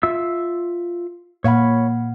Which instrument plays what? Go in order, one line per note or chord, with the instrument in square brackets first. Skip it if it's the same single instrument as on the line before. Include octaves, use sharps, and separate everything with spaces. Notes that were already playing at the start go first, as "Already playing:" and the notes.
[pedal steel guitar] F4 E5 E6
[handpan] A#2 F5 F#5 [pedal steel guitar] C#5 B5